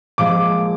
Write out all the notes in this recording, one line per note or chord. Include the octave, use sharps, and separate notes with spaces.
A#2 F3 G#3 D6